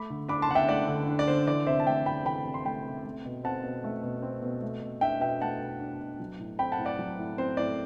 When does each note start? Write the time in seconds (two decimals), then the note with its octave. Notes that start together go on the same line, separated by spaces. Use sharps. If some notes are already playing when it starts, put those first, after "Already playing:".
Already playing: A3 B5 D6
0.10 D3
0.29 D4 B5 D6
0.42 A5 C6
0.49 D3 F#5
0.55 E5 G5
0.68 A3 D5 F#5
0.88 D3
1.08 D4
1.19 D5
1.27 D3 C5
1.47 E3 D5
1.66 C3 C5 E5
1.80 A5
1.87 A3 E5 G5
2.06 C3 G5 B5
2.25 E3 G5 B5
2.46 C3
2.54 C6
2.65 A3 G5 B5
2.85 C3
3.05 A3
3.25 B2
3.44 C4 F#5 A5
3.63 B2
3.84 A3
4.03 B2
4.22 C4
4.42 B2
4.62 A3
4.82 B2
5.01 D4 E5 G5
5.21 B2 E5 G5
5.41 A3 F#5 A5
5.61 B2
5.80 D4
6.01 B2
6.20 F#3
6.40 A2
6.59 C4 G5 B5
6.72 F#5 A5
6.79 A2
6.85 D5 F#5
6.99 F#3
7.19 A2
7.38 C4 C5
7.57 A2 D5